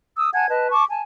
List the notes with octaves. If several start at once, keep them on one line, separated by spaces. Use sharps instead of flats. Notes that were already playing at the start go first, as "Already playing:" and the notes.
D#6 E6
F#5 G#5 A5 G#6
B4 D#5 A5
A5 C#6 D6
G#5 A5